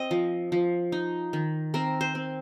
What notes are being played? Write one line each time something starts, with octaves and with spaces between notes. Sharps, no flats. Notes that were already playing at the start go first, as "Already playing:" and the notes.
Already playing: C4 D#5
F3
F3
D#4
D#3
C4 A#4
C5
C4